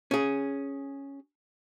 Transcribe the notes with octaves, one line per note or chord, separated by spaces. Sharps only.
C#4 G#4